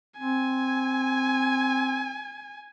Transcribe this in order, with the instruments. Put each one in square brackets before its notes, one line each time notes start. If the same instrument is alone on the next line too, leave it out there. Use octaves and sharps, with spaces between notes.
[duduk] C4 [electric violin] G#5